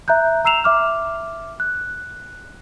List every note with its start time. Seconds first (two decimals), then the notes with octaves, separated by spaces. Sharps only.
0.08 E5 A#5 F#6 G6
0.45 A#5 E6 C7 E7 F7
0.64 E5 D6 F6
1.60 F#6